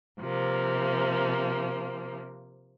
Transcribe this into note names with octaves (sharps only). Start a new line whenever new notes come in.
C3 F3 A#3